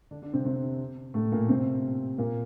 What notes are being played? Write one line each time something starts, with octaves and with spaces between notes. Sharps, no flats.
D3 D4
D3 D4
C3 C4
C3 C4
A2 A3
A#2 A#3
C3 C4
A#2 A#3